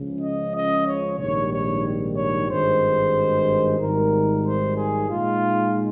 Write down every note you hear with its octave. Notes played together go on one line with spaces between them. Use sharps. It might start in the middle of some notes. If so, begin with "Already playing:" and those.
Already playing: C#2 C#3 F3
D#5
D#5
C#5
A#1 G#2 D#3 G3 C#5
C#5
C#5
G#1 G2 D#3 G#3 C5
G#1 G#2 D#3 G3 A#4
C5
G#4
A#2 G#3 D#4 F4